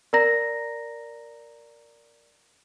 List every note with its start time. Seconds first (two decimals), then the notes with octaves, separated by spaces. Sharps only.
0.13 A#4 D5 A#5 A#6